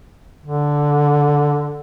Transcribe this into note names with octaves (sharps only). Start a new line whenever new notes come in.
D3